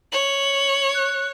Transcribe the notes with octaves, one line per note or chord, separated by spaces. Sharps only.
C#5 F#7
F#6